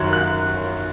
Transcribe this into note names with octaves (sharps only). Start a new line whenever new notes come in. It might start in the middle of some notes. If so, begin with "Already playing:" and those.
Already playing: F#2 D#3 F#3 F#6 G#6
F#6